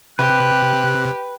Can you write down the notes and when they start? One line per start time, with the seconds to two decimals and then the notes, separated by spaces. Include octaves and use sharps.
0.19 C3 G4 B4 F#6